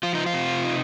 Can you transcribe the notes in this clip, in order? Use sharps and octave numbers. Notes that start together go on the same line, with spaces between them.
F3 F4
D#4
F4
C3
D#4